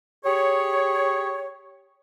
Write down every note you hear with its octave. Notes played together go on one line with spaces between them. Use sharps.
G4 G#4 C#5